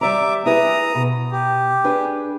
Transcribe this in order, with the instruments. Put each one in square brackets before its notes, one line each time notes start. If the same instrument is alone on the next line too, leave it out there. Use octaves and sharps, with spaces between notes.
[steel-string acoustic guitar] G3 D5 A#5 [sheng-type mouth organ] E5 D6
[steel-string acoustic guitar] E4 G#4 B4 [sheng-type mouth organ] A#5 D#6
[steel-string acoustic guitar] B2
[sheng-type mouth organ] G4
[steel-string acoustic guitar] D4 G#4 B4